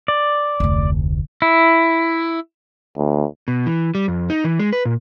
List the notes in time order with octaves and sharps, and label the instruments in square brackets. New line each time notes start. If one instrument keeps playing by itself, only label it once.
[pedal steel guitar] D5
[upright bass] F1 D2
[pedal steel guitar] E4
[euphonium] D2
[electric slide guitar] B2
E3
G3
F2
D#4
E3
G#3
B4
A#2